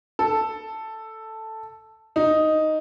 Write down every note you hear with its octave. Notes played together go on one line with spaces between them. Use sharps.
A4
D#4